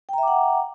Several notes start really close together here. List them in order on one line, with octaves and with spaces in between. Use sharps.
G5 A#5 E5 D6 F#5